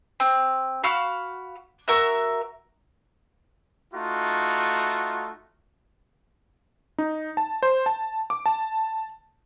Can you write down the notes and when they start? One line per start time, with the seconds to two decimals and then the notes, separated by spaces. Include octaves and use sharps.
0.20 C4
0.84 F#4 F5 B5 F6
1.88 F#4 A#4 E5 F#6
3.94 A3 D#4 F4 F#4
6.98 D#4
7.37 A5
7.63 C5
7.86 A5
8.30 D6
8.46 A5